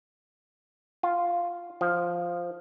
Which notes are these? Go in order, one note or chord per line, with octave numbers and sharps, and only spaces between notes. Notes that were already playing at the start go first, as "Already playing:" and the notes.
F4
F3